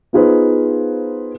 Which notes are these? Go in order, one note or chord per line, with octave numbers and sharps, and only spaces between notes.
B3 D#4 F4 G#4 B4 C5